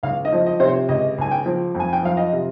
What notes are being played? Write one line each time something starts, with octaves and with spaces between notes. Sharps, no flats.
C#2 F5
D#5
F3
D#5
C3 C5
C#5
C#2 D#5
C#2 G#5
G5
F3
F2
G#5
G5
F3 F5
D#5
C3